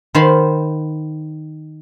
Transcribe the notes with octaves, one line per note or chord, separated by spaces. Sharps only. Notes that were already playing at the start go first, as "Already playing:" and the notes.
D#3 C5 F5 A5 B5